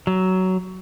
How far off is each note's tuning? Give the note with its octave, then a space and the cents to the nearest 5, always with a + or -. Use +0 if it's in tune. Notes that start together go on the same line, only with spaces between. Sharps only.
F#3 +15